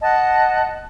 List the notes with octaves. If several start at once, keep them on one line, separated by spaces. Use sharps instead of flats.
D#5 F#5 A5